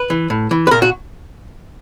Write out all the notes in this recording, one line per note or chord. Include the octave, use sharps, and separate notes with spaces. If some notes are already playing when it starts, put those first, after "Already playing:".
Already playing: B4
E3
A2
E3
B4
A#2 A#4
F#4